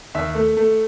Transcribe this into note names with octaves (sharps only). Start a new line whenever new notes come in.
D#2 E5
A3
A3